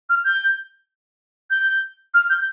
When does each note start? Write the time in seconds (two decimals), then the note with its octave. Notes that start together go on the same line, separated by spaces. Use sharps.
0.09 F6
0.25 G6
1.50 G6
2.14 F6
2.30 G6